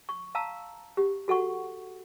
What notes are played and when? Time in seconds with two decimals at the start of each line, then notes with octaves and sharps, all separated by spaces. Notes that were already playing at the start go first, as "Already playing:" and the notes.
0.09 C#6
0.35 F5 A5 A#5 E6
0.97 G4
1.28 F#4 A4 F#5 C#6